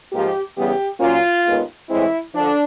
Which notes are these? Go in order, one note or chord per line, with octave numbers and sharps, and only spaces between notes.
G#2 F3 A#3 G4
E2 C#3 E3 G3 B3 G4
A#2 F#3 A#3 C#4 F4
D#2 D#3 G#3 B3
A2 E3 G#3 C4 E4
D3 F3 D4